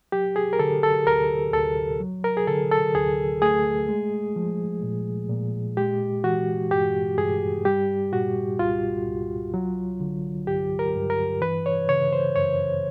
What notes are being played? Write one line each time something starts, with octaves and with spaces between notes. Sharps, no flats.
F#3 G4
G#4
A#4
D3 A4
A4
D2 A#4
D2 A4
F#3
A#4
G#4
D3 A4
A4
D2 G#4
A3 G#4
G#3
F3
A#2
A#2
G#3 G4
E3 F#4
G2 G4
G2 G#4
G3 G4
A#2 F#4
C2 F4
C2
F#3
D3
G2 G4
A#4
G2
A#4
E3 B4
C#5
C#3 C#5
C5
F#2 C#5